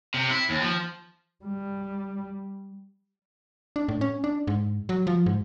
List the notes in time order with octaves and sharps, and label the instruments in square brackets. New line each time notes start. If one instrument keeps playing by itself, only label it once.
[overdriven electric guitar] C3
E4
D#2
F3
[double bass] G3
[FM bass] D4
A2
C#4
D4
G#2
F#3
F3
G#2